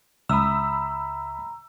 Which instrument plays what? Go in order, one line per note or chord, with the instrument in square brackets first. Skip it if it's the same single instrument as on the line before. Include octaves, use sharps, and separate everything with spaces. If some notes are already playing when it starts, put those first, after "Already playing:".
[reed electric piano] C#2 E5 D#6 [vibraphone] A#5 [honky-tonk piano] B5 E6